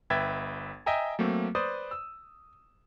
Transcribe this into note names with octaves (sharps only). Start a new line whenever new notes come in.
G1 B4 E5 G5 G#6 A6
D#5 E5 G5 G#5 A#5
F#3 A3 A#3 C4
B4 C5 D5 D#6
E6